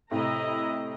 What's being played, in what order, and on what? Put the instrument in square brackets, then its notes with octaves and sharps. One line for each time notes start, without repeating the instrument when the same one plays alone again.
[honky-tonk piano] A2 C3 [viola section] E4 D#5 A#5